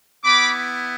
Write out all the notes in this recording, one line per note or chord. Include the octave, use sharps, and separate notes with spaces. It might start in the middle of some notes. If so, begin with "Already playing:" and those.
B3 E4 B5 D6